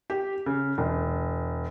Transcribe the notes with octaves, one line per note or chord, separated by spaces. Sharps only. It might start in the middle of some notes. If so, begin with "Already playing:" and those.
G4
C#3
E1